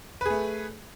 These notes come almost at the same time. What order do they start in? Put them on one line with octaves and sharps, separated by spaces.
B4 G#4 A3